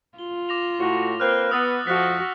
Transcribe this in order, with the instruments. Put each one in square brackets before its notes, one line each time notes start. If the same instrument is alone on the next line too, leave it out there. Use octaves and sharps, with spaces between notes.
[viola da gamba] F4 [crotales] G7
[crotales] D6 A#6 F7
[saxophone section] A2 F#4
[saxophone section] A#3 C4 B4 [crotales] F6 F#6
[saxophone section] B3 [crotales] D#6 E6 A6
[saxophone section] F2 F3 [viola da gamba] F#4 [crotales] F6 F#6 B6